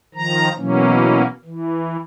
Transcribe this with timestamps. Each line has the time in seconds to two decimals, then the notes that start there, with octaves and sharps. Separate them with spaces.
0.14 D#3 F3 A#5
0.57 B2 E3 F#3 A#3 C#4
1.45 E3